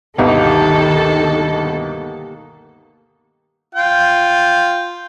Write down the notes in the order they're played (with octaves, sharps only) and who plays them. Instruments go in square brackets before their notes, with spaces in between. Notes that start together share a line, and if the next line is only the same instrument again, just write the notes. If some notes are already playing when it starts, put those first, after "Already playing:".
[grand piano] G1 D2 B2 [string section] D#3 A4 [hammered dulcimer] A#3 D#4 G4
[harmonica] F4 G5